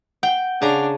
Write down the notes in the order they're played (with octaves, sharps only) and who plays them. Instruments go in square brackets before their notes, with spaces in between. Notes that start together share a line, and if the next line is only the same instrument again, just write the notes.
[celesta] F#5 [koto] G5
[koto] C#3 A#5 [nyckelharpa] D4